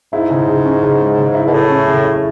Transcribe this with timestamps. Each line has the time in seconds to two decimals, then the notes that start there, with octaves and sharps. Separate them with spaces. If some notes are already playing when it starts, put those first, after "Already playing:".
0.12 G#2 E4
0.30 C#3
0.48 C#3
0.65 C#4
0.83 C#3
1.00 G#3
1.18 C#3
1.34 E4
1.47 B2
1.52 A2 C#3
1.69 C#4
1.87 C#3
2.04 E4